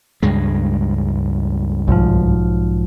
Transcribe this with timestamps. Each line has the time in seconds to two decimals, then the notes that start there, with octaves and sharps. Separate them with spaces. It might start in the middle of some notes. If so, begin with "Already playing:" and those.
0.23 C#2 G2 G#3
1.88 B1 G#2 F3